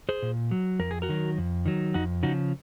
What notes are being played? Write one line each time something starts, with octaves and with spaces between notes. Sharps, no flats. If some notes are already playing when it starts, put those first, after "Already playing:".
G#4 C5
A#2
F#3
F2 A#4
G#4
F#4 A#4
D#3 F#3
F2
D#3 F#3
F2 D#4 F#4
C#3 F3 D#4 F#4